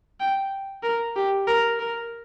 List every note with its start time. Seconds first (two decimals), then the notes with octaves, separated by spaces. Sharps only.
0.20 G5
0.83 A#4
1.16 G4
1.47 A#4
1.79 A#4